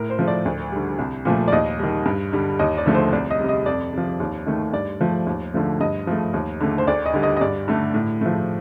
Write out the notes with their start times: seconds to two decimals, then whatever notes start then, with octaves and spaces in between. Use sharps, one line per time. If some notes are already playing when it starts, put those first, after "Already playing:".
Already playing: A2 A#4
0.10 C5
0.19 F3 A3
0.27 D5
0.45 D2
0.72 D3 G3
0.99 C2
1.25 A#2 F3 A3
1.48 D5
1.52 D#2 D#5
1.79 D#3 G3
2.06 G2
2.33 D3 G3
2.59 D#2 D#5
2.77 D5
2.86 D3 F3 A3
2.95 C5
3.13 C2 D5
3.30 D#5
3.40 C3 G3
3.49 D#5
3.66 F2 D5
3.93 C3 F3
4.20 D#2
4.47 D#3 A3
4.73 G2 D5
5.01 F3 A3
5.27 D#2
5.54 D3 F3 A3
5.81 G2 D#5
6.07 F3 A3
6.34 D#2
6.60 D3 A3
6.78 C5
6.87 D2 D5
7.06 D#5
7.14 D3 G3
7.23 D#5
7.37 D#5
7.41 G2 D5
7.68 D3 A3
7.94 A2
8.21 F3 A3